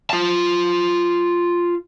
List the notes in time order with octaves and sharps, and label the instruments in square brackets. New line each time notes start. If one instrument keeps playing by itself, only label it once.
[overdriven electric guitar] F4 A5